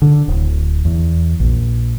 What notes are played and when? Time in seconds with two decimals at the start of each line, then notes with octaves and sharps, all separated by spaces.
0.02 D3
0.28 D1
0.85 E2
1.40 A#1